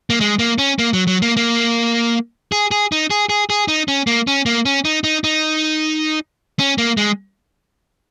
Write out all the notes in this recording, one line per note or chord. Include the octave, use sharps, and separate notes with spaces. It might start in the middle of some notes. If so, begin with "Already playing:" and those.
A#3
G#3
A#3
C#4
A#3
F#3
F#3
A#3
A#3
G#4
G#4
D#4
G#4
G#4
G#4
D#4
C#4
A#3
C#4
A#3
C#4
D#4
D#4
D#4
C#4
A#3
G#3